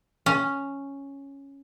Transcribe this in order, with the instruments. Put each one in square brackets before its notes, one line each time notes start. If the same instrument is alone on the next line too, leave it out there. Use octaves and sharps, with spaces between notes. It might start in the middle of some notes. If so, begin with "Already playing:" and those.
[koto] C#4